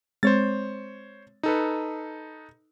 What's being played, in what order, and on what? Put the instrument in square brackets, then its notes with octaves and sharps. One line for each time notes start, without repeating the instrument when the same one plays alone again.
[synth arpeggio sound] G#3 C4 [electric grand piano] C5 C#5 A6
[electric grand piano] D#4 A4 B4